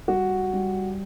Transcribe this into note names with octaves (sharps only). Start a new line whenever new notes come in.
G3 F#4
G3